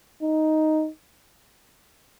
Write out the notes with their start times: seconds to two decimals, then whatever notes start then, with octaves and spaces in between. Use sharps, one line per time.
0.22 D#4